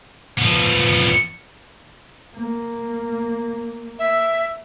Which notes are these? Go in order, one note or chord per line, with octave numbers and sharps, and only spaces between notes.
F3 B3
A#3
E5